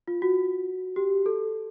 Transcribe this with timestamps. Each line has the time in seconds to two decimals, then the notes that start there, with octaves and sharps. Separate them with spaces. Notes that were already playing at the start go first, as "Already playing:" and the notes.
0.08 F4
0.22 F#4
0.96 G4
1.26 A4